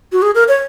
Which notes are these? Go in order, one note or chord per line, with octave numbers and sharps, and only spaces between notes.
F#4
G#4
A#4
C#5